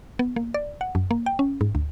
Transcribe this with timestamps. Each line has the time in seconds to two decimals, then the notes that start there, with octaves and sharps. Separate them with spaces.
0.19 B3
0.36 A#3
0.54 D5
0.81 F#5
0.95 F#2
1.11 A#3
1.26 G5
1.39 C#4
1.61 G#2
1.75 D2